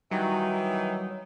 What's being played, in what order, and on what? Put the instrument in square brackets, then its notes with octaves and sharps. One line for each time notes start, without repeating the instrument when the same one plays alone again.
[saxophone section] D#3 E3 D#4 [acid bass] F#3 [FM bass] G3